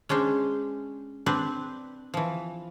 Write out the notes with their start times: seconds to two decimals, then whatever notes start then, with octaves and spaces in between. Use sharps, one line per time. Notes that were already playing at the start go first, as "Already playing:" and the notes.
0.09 G#3 C#4 D4 C5
1.26 C4 D4 B4 C5
2.14 E3 F3